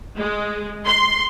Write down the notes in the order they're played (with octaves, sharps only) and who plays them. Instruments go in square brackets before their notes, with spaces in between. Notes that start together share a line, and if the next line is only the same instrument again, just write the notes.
[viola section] G#3
C6